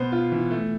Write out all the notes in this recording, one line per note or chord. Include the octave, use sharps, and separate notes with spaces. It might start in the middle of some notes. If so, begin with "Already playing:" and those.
Already playing: B2 B3 C5
F4
E3
A3